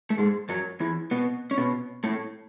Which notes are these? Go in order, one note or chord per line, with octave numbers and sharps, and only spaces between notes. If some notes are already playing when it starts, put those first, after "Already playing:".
A3
G#2 G#3
F#2 F#3
E2 E3
B2 B3
C#4
B2 B3
A2 A3